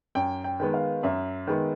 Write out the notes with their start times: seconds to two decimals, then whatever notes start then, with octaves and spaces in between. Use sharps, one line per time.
0.15 F#2 G5
0.44 G5
0.60 D#3 G#3 B3
0.74 F5
1.03 F#2 E5
1.47 D#3 G#3 B3